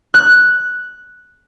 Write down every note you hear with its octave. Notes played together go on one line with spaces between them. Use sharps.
F#6